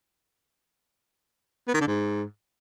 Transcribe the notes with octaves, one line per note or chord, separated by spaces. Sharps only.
B3
D#3
D3
G#2